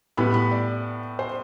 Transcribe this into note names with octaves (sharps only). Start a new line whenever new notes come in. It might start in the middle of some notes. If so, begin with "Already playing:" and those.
A2 G3 B3 B5
B5
D5
C5